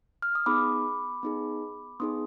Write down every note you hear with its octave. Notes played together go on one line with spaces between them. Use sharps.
F6
D#6
B3 D#4 G#4 B5 D6
B3 D#4 G#4
B3 D#4 G#4 C6 D#6